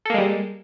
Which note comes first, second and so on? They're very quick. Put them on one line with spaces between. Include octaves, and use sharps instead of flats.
A4 A#3 G#3 G3